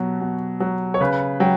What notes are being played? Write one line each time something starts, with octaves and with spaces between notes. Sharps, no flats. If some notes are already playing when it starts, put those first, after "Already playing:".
Already playing: B2 F#3
B2
F#3
C#5
C#3 B4
F#3 G5